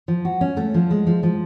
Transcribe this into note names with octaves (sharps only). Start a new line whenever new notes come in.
F3
F#4
C#4
A3
F3
G#3
F3
F3